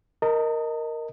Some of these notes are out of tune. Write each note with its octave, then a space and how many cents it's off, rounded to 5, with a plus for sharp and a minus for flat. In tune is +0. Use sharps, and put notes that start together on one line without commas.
A#4 +0 D#5 +0 A5 +40